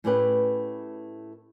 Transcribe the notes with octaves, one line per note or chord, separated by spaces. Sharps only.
A2 A3 C#4 G4 G#4 B4